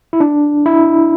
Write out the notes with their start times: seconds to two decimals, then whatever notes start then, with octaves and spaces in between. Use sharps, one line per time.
0.13 E4
0.20 D4
0.66 E4